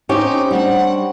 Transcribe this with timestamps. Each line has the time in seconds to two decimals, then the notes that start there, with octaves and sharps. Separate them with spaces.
0.09 C4 C#4 D#4 G4 C#5
0.51 G3 D4 F#5